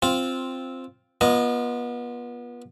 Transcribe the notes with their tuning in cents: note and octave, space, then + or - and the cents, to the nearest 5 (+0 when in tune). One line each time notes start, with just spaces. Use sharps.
C4 +0 F4 +5
B3 -30 F4 +0 D#5 +0